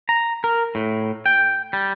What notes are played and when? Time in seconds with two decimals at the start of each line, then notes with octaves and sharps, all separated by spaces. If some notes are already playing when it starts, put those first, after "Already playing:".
0.09 A#5
0.44 A#4
0.75 A2
1.26 G5
1.73 G3